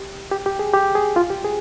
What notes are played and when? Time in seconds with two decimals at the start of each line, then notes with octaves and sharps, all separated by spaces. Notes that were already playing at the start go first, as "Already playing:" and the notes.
Already playing: G4
0.31 G4
0.46 G4
0.59 G#4
0.73 G4
0.95 G#4
1.16 F4
1.30 G4
1.45 G#4